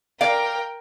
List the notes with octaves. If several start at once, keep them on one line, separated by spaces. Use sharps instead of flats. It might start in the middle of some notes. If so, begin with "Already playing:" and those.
A#4 D5 F5 G5